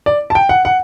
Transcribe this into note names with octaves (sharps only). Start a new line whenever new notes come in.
D5
A5
G5
F#5
F#5